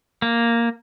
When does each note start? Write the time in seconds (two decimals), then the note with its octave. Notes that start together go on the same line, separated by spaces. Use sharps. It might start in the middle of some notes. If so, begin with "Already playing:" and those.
0.22 A#3